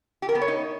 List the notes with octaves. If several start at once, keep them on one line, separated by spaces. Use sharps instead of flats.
G4
A#4
B3
C#5
D#4